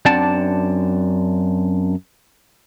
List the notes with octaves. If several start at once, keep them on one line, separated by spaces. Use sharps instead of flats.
F#2 C4 D4 D5 F#5 A5